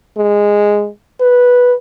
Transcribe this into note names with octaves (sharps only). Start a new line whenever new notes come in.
G#3
B4